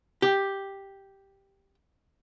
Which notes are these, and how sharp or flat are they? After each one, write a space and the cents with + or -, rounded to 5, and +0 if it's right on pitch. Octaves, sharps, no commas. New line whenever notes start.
G4 +0